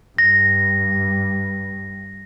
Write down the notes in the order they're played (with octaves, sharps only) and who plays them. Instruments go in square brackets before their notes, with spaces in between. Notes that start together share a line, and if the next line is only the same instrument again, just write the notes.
[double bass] G2 [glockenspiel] A#6